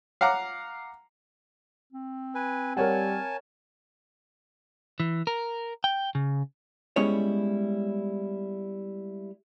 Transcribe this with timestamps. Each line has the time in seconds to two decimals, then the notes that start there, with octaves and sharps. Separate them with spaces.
0.21 F5 F#5 A#5 D6
1.93 C4
2.35 B4 G#5
2.77 G3 A#4 C#5 F#5 G#5 A5
5.00 E3
5.27 A#4
5.84 G5
6.15 C#3
6.96 G3 G#3 B3 C#4 E4 C#5